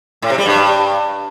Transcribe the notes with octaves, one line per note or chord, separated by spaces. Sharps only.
A2
C3
G3
G2